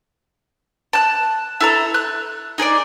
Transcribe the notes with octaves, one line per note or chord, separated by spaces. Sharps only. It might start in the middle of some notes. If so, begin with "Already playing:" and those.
A5 F#6
E4 A4 A#5
F#6
D#4 G#4 B4 D5